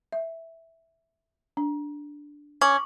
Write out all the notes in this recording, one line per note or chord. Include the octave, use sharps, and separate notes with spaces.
E5
D4
C#4 C#6 D6